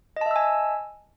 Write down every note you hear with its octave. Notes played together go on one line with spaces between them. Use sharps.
D#5 E5 G#5 A5 E6